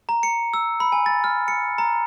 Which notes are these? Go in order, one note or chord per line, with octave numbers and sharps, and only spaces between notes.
A#5
C#7
E6
B5
G#5
A6
F6
C#7
A#5